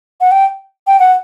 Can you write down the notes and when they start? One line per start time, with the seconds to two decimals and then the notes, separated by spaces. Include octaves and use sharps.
0.21 F#5
0.31 G5
0.87 G5
1.00 F#5